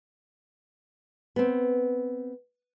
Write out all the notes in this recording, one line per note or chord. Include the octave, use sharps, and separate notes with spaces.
B3 C4